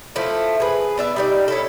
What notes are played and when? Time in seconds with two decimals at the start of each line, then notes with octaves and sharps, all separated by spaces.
0.15 F3 A3 E4
0.60 G#4 B4
0.97 B3 D5 E5
1.16 G3 D#4 D5
1.48 C#4 E4 A4